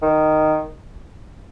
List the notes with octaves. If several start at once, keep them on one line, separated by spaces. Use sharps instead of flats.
D#3